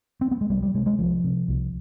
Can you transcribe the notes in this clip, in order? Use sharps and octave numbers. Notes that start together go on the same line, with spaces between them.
C4
B3
G#3
C2 G3
G3
C3 G#3
G#3
C2 F3
C3
C2